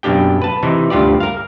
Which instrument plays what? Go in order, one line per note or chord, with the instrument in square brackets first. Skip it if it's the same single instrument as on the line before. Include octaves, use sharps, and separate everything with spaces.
[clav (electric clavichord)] F#2 B2 A#3 D4 G4 G5
B4 A5
C3 E3 D#4
D2 G2 F4 G4 D5
A#4 F5